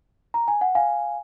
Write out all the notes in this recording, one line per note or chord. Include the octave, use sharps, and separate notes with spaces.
A#5
G#5
F#5
F5 G#5